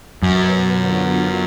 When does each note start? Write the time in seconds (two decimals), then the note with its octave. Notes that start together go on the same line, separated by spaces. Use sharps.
0.22 F#2 B2 F#3 B3 F#4
0.74 D3 F#3 B3 F4